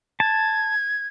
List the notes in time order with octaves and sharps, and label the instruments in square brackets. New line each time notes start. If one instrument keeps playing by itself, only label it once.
[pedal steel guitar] A5 [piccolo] G#6